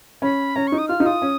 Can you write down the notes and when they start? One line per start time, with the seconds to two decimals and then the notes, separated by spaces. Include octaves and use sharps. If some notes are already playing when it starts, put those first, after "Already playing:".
0.22 C#4 B5
0.56 C#4 A#5
0.67 C#6
0.72 D#4
0.78 D#6
0.88 F4 F6
1.00 D#4
1.05 F4 D#6
1.22 C#4